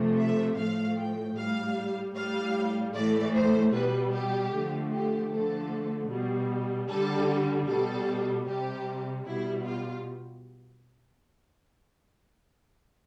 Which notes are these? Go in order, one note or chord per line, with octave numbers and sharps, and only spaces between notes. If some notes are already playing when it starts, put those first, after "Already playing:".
Already playing: C3 F3 A3
E5
A2 F3 A3 F5
G5
A2 G3 F5
A2 G3 F5
A2 E3 A3 D5
C5
B2 G3 B4
G4
D3 F3 A3
G4
D3 F3 A3 A4
B2 G3
D3 G3 A4
B2 G3 A4
C3 G3 G4
B2 G3 E4
F4